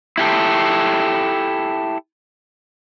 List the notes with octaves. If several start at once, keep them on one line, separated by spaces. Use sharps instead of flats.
E4 G4 A4